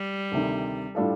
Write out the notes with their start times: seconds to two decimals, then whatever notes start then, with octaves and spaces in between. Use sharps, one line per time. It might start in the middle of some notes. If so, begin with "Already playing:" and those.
Already playing: G3
0.32 D2 C3 D#3
0.95 A2 G3 D4 F4 A4